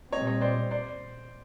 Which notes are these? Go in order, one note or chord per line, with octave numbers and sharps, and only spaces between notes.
A#2 G3 C4 C#5 D#5
C#5 D#5
C5 D5
C5 D5